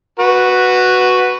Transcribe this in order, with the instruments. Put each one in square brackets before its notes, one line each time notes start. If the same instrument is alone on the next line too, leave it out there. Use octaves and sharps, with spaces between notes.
[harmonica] F#4 B4